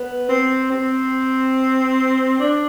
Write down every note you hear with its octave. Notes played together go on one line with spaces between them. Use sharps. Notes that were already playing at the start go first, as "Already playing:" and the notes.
Already playing: B3
C4
C4
D4